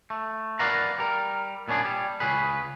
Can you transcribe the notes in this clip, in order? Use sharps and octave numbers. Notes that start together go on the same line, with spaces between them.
A3
A#4 B4 D5 F5 F#5 A#5
G3 A#4
A#2 B3 C#4 D4 G#4
G3
C#2 C#3 G#4 B4